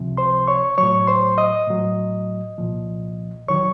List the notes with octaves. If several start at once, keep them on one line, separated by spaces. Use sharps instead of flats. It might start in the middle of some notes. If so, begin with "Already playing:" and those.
Already playing: C#2 C3 F3
C5 C6
C#5 C#6
A2 F#3 C#5 C#6
C5 C6
D#5 D#6
A2 F#3
C2 A#2 F3
D#2 D#3 F#3 C#5 C#6